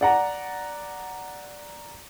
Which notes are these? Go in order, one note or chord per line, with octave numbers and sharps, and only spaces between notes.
D5 F#5 A#5